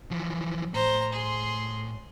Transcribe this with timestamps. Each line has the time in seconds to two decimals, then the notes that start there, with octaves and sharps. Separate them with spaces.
0.11 E3 F3
0.74 A2 C5 A#5
1.13 G#4 C6